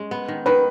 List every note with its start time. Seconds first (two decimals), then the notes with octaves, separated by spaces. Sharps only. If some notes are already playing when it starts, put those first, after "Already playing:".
Already playing: G#3 C#4
0.11 B3
0.28 D#3
0.46 D#3 B4